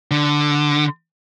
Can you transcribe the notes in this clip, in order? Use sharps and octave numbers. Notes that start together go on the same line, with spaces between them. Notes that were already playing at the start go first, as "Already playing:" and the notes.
D3